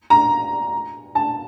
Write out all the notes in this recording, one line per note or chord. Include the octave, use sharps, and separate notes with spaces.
A#5
A5